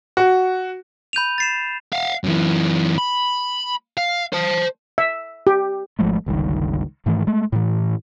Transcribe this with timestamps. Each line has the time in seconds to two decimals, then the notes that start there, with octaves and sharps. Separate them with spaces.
0.17 F#4
1.13 B5 G6 D#7 F7
1.38 A6 C7 E7
1.93 F5 F#5
2.24 F#2 E3
2.98 B5
3.97 F5
4.33 C5 A5
4.98 E5
5.47 G4
5.99 G#1 F3 G#3 A3
6.26 G1 C#2 G2 D#3
7.06 G#2 D#3 E3 A3
7.27 G#3 A3
7.52 A2 E3